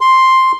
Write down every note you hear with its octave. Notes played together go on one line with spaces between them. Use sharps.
C6